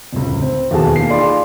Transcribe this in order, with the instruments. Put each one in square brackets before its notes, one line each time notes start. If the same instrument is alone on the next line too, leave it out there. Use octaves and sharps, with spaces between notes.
[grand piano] D1 C#2
C4
D#2 B2 E3 F#4 G#4 A5
A#3 C7
D#4 F4 G#4 D5 B5 C6